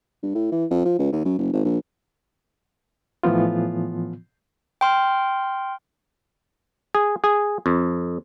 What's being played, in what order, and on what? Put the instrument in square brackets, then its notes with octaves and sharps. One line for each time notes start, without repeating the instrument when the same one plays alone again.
[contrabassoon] G2
A2
E3
F2
F3
C#2
D#2
F#2
F#1
G#1
A#1
[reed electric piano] A2 E3 F3 B3 F4
[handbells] G5 C6 F6
[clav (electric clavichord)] G#4
G#4
F2